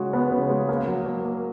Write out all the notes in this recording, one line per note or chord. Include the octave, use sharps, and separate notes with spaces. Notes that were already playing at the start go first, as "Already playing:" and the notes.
Already playing: C#3 G#3 F#4
B3
C#3
G#3
A#3
F#3
A#3
A#3